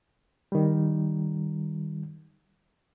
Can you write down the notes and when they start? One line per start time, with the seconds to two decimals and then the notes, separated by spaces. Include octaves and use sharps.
0.52 D#3 G3